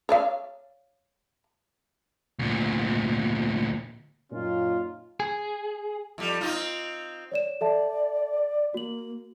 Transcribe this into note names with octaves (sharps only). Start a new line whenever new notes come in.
C#5 D5 F5
D2 A#2
F#2 A#2 C#4 D#4 F4
G#4
F2 G3
C4 D#4 F4
C#5 D5 E7
A4 D5 E5 A5
A#3 F#4 F#7